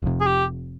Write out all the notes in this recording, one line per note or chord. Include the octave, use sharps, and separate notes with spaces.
F1 F2 C3
G#4
G4